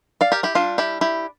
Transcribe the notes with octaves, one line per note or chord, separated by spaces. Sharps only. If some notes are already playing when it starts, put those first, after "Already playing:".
D5 F5
G4 A#4
E4 G4
G3 D4 F4
E4 G4
E4 G4